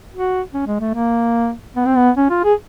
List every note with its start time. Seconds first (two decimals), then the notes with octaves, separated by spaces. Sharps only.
0.13 F#4
0.54 C#4
0.67 G#3
0.80 A3
0.94 A#3
1.76 B3
1.86 C4
1.97 B3
2.17 C#4
2.30 F4
2.44 G#4